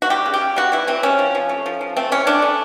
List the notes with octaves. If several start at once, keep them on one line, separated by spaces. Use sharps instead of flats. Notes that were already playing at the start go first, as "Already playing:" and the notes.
F#4
G3 G4
C#3
G4
C#3
G3 F#4
E3 E4
E3 C4
C3 C#4
F3
F3
A3
F3
F3
A3 C4
E3 C#4
A3 D4
A3